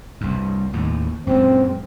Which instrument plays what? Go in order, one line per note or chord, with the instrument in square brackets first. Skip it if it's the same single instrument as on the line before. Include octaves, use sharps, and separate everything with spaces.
[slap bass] C2 G2
D#2 A2
[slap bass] F#2 A#2 G#3 [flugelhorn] C4